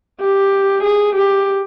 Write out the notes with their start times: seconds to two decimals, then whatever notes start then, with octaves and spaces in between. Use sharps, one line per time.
0.20 G4
0.84 G#4
1.16 G4